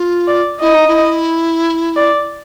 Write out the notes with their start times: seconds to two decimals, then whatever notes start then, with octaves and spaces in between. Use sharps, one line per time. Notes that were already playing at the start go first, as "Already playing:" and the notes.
Already playing: F4
0.27 D5
0.61 E4 D#5
0.74 D#4
0.88 E4
1.96 D5